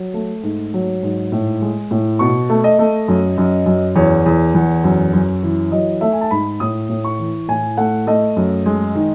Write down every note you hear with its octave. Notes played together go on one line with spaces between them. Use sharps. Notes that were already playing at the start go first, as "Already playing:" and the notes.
Already playing: F#3
A3
G#2
F#3
G#2
A2
G#3
A2
B2 C#6
A3
D#5
A3
F#2
F#2
F#2
E2 C#5
E2
E2
F#2
F#2
E3
F#3 D#5
A3 E5
G#5
A5
G#2 B5
A2 D#6
A2
C#6
E3
A2 G#5
A3 F#5
A3 D#5
F#2
G#3
D#3